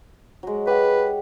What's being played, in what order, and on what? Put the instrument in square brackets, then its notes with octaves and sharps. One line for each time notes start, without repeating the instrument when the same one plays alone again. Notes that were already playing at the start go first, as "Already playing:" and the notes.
[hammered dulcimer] F#3 G#3
[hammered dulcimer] G4 F#5 [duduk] B4